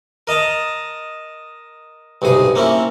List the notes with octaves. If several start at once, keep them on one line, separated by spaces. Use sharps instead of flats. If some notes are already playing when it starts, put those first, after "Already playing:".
A#4 D#5 A5 A#5
B1 G2 C3 G#4
A#3 C4 C#4 E4